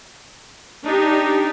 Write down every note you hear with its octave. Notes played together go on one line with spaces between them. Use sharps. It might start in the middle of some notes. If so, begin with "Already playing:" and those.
D4 D#4 G4